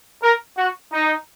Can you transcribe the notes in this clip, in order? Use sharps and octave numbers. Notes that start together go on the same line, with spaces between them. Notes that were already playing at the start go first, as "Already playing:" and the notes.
A#4
F#4
D#4